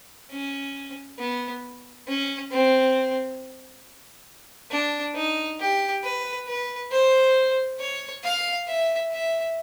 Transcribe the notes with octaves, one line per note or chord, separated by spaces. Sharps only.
C#4
B3
C#4
C4
D4
D#4
G4
B4
B4
C5
C#5
F5
E5
E5